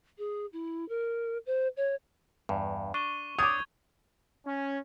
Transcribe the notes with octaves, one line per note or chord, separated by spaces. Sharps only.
G#4
E4
A#4
C5
C#5
E2 G2
D4 C#6 D#7 G7
D4 C#5 D6 D#6 G6 G#6 F7
C#4